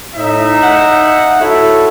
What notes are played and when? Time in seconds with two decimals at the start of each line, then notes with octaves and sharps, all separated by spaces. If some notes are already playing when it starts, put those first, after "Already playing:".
0.15 A2 D#4 E5
0.63 F#5 G6
1.41 E4 F#4 A4 C#5 E5